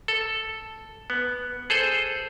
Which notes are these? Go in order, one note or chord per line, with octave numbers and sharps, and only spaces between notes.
A4
B3
G#4 A4 C5